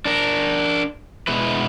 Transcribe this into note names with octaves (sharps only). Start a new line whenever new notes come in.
D4 A#4
B2 G#3 E4 B4